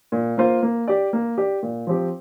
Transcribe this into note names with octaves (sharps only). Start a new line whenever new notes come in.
A#2
A#3 F4 C5
A#3
G4 D5
A#3
G4 D5
A#2
F3 C4 G4